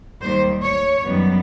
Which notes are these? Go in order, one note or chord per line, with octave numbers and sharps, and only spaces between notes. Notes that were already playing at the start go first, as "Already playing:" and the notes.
D#2 D#3 G3 A#3 C5
C#5
F#2 D#3 G3 B3